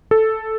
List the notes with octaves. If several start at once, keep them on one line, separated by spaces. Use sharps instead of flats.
A4